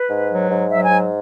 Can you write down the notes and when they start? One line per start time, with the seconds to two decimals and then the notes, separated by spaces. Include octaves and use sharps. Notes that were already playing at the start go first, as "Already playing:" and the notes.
Already playing: B4
0.10 G#2
0.30 F#3
0.50 G#2
0.70 F#3 E5
0.85 G#2 G#5